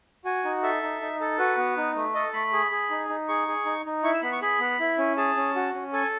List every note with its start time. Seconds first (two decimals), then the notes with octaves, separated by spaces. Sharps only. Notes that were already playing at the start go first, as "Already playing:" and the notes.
0.25 F#4 G#5
0.45 D#4
0.63 A4 E5
0.82 D#4
1.02 D#4
1.21 A4
1.39 F#4 B4
1.57 B3
1.77 D#4
1.96 A3
2.15 A4 D#5
2.34 A3 B5
2.53 G#4
2.71 G#4
2.90 D#4
3.09 D#4
3.28 G#4 C#6
3.48 G#4
3.66 D#4
3.85 D#4
4.04 E4 C#6
4.14 E6
4.22 B3 B5
4.32 C#6
4.42 G#4 B5
4.60 B3
4.80 E4
4.98 C#4
5.17 G#4 A5
5.37 C#4
5.56 F#4
5.74 C#4
5.93 A4 G#5